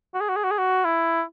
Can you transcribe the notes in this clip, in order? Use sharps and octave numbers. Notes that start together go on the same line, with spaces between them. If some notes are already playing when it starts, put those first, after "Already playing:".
F#4
G#4
F#4
G#4
F#4
G#4
F#4
E4